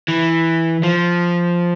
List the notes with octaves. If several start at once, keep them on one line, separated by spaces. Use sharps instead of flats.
E3
F3